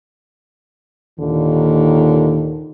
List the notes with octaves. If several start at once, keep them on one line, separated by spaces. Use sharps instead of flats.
D#2 A#2 D3 D#3